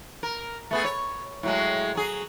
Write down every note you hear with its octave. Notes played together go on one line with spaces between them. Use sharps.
A#4
A3 B3 G#4
C#5
A2 F#3 G#3
F#3 G#4